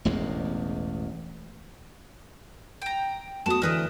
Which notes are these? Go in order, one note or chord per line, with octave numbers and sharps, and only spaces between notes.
E1 A1 E2 G#3
G5 A#5
A3 B3 F#4 A5 D#6
D2 E3 A3 A#4 B4 D#5